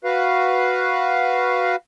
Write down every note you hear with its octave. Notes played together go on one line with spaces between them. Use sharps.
F#4 B4 F5